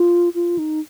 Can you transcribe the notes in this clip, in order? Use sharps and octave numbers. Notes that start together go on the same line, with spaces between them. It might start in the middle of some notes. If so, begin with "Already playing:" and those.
Already playing: F4
F4
D#4